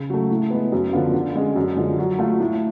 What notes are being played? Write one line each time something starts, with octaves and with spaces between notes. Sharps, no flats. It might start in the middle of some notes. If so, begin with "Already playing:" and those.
Already playing: C#3
F#3 A3
A2
G#3 B3
F#2
D3 F3 B3 F4
D3
G#3 C#4 G#4
F#2
D3 F3 G#3
F#3
A3 F4 A4
A2